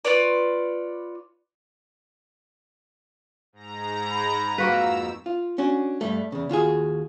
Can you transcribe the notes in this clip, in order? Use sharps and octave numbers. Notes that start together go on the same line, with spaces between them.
F4 B4 C#5 D5
G#2 A#5
B5
F2 A#3 F#4 B4 F5 E6
F4
C#4 D4 F#4
G2 G3 A3
E2 C#3
D#2 F4 F#4 G#4